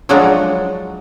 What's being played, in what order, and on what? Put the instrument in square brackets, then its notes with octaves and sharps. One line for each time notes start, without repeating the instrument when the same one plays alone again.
[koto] F3 F#3 G#3 D4 D#4 F#4